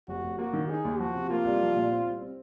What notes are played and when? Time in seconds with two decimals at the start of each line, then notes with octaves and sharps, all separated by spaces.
0.08 F1 F#4
0.24 F1
0.38 A#3 F#4
0.53 D#3
0.69 D#4 G#4
0.85 D#2
0.99 F3 F#4
1.15 C3
1.30 A#3 F4
1.45 C2
1.61 F3
1.76 A#2
1.91 C4
2.06 C2
2.21 C4